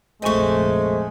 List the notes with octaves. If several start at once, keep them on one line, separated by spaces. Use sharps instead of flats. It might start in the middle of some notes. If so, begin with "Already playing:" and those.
F1 A#1 G#3 A3 C4 D#5 G#5 C#6